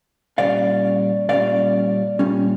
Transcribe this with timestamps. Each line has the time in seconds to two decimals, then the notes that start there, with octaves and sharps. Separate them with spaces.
0.38 A#2 G3 C#4 D5 F5
1.29 A#2 G3 C#4 D5 F5
2.19 A#2 G3 C#4